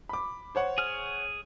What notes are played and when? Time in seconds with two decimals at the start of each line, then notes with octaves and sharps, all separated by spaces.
0.09 B5 D6
0.55 C5 C#5 F#5
0.78 G#4 F6